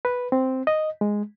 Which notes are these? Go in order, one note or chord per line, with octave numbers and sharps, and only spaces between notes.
B4
C4
D#5
G#3